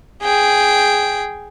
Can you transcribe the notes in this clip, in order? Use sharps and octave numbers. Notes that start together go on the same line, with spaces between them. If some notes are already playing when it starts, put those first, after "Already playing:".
G#4 G5